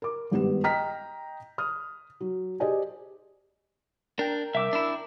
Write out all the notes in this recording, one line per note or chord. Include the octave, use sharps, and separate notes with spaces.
A#4 D6
G#1 G2 B3 G4 B4 E7
D#5 G5 A#5 F6 B6
D#6 F6
F#3
G4 G#4 C5 D5 D#5 G#5
D4 A#4 G5
C2 E5 D6 E6
D4 E4